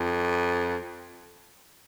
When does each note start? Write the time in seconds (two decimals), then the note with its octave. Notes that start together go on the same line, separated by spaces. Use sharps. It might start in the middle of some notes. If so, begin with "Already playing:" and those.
Already playing: F2